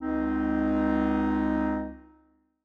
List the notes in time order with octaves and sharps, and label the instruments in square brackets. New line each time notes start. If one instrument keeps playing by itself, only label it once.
[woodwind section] C#2 C4 D#4